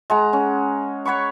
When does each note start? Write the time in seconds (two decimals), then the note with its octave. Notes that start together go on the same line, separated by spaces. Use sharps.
0.10 G#3 F#5 A#5
0.33 C#4
1.05 C#5 F#5 B5 C#6